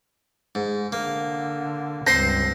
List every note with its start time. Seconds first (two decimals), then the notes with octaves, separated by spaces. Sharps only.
0.55 G#2
0.92 D3 A#3
2.07 C#2 G2 C4 C5 F#5 A#6 C7